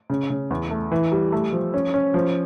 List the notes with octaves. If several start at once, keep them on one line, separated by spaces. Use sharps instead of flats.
C#3
C#3
E2
A3
E3
G3
A3
F3
C#4
C#4
F3